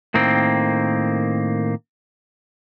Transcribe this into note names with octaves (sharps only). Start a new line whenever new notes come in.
A2 D#3 A#3 C4